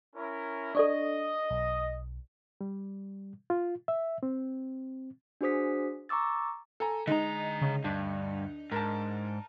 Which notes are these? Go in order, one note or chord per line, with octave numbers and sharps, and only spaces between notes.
C#4 E4 A#4
D4 A4 D5 D#5 C#6
B1
G3
F4
E5
C4
D4 F#4 G#4 C5 D#6 B6
A#5 C#6 D6 E6 A6
A4 G#5 A#5
D3 G#3 D#4 A#5
C#3
D2 G2 D4
G#2 A#4 A5